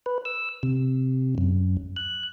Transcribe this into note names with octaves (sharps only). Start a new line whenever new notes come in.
B4
E6
C3
F#2
F#6